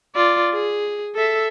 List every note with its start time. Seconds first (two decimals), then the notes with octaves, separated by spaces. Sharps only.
0.15 F4 D5
0.54 G#4
1.16 A4 E5